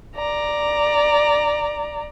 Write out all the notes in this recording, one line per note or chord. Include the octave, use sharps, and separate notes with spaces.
D5 A#5